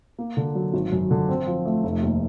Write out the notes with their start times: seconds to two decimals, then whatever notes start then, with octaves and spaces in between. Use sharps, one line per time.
0.18 A#3
0.37 D3
0.55 F#3
0.74 G#1
0.92 F#2
1.11 D3
1.29 C4
1.47 F3
1.65 A3
1.84 F1
2.03 D#2